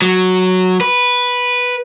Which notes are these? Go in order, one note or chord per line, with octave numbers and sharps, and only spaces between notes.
F#3
B4